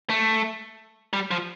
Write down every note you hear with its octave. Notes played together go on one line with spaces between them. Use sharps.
A3
G3
F3